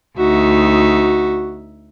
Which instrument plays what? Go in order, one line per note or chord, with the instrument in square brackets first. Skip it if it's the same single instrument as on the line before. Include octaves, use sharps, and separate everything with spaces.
[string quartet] D2 D#4 E5 [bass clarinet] F#4